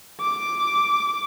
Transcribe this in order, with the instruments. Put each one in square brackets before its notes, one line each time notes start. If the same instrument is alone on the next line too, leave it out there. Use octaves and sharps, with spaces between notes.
[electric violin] D6